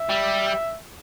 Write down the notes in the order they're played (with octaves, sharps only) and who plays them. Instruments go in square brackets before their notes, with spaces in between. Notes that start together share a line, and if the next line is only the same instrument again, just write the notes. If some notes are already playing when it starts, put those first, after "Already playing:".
Already playing: [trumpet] E5
[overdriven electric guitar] G3